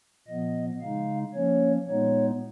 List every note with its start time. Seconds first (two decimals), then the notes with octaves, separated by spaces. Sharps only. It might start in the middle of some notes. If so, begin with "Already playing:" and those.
0.28 A#2 F3 B3 D#5
0.81 C#3 G#3 D#4 F5
1.34 F3 A#3 C#4 C#5
1.88 A#2 G#3 B3 D#4 C#5